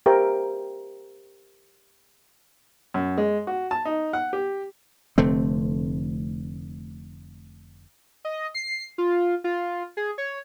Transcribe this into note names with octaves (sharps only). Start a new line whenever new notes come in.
G4 A#4 C5 E5 G5
F#2
G#3
F#4
A5
D#4
F#5
G4
F1 D3 A3 C4
D#5
C7
F4
F4
G#4
C#5